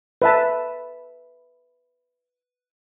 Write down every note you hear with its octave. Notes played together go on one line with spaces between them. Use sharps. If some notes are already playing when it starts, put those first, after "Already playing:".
B4 E5 A5